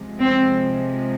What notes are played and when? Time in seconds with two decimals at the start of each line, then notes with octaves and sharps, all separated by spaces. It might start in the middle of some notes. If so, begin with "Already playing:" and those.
Already playing: C3 F3 G#3
0.20 C4